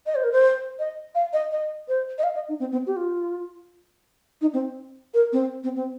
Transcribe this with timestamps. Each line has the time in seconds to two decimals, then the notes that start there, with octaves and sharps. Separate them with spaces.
0.06 D#5
0.15 C5
0.24 A#4
0.32 C5
0.79 D#5
1.15 F5
1.33 D#5
1.51 D#5
1.88 C5
2.18 D#5
2.24 F5
2.35 D#5
2.49 D#4
2.60 C4
2.72 C4
2.87 G4
2.97 F4
4.41 D#4
4.53 C4
5.14 A#4
5.33 C4
5.64 C4
5.76 C4